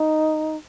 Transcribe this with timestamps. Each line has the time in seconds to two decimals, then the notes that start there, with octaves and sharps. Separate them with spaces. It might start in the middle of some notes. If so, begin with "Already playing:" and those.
Already playing: D#4